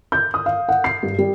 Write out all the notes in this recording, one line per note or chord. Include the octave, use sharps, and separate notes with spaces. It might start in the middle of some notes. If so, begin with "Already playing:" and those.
G6
D#6
F5
F#5
C7
G2
G3